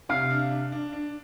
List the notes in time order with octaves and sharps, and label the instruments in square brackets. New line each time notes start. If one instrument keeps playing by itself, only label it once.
[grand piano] C3 [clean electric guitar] F5
[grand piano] D4
D4
D4
D4